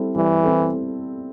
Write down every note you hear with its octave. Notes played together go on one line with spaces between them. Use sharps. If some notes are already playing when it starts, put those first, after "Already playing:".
Already playing: G3 C4 E4 A4
E3 G3
C4 E4 A4